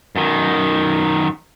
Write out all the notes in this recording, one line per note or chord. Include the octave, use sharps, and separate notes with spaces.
F#2 D#3